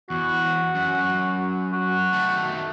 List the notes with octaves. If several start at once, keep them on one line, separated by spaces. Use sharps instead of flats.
E2 F#4
F#2
F#4
D#3 A3